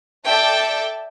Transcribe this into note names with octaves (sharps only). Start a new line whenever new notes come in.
A4 D5 E5 G5 A5